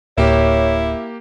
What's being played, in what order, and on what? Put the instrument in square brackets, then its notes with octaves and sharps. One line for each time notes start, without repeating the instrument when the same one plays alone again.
[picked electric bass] D1 [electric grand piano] A#3 G4 [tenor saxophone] E4 [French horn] C#5